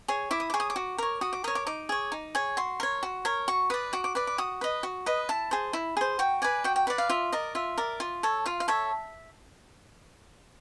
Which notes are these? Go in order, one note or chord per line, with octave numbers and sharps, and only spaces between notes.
G#4 C#5
E4 D6
D#6
G#4 C#5 D6
D#6
D6
F#4
A#4 C#5
F#4 D#6
D6
A#4 C#5 D#6
D6
D#4 D6
G#4 C#5
D#4
G#4 C#5
F#4 C6
A#4 C#5
F#4
A#4 C#5
F#4 C#6
B4 D5 D#6
F#4 D6
D6
B4 D5 D6
D6
F#4 D#6
B4 D#5
F#4
B4 D#5
E4 A5
G#4 C5
E4
G#4 C5
F#4 G5
B4 D5 G#5
F#4 G5
G5
B4 D5 F#5
F5
F4 E5
A#4 D5 D#5
F4 E5
A#4 D5
F4
A4 C#5
F4 F5
F5
A4 C#5 E5